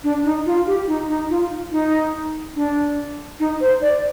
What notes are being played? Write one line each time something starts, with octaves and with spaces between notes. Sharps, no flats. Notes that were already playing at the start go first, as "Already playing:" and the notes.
D4
D#4
F4
G4
D#4
D#4
F4
D#4
D4
D#4
C5
D5